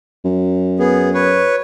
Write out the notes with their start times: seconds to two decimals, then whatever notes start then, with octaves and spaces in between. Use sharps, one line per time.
0.25 F#2
0.79 B3 G#4
1.14 B4 C#5